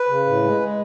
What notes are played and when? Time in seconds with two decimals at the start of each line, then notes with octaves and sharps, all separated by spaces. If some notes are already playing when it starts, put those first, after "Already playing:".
Already playing: B4
0.09 C#3
0.26 A2
0.44 G#3
0.61 G#3